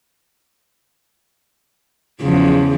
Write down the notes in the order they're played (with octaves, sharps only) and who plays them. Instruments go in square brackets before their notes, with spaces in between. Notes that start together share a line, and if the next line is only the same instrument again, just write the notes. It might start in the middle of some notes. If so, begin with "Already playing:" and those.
[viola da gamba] E2 C#3 F3